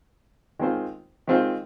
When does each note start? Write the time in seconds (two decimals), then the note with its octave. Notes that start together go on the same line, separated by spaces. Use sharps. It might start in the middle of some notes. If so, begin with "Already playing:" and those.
0.59 D#3 G#3 C4 F4 C5
1.27 D#3 G#3 C4 F4 C5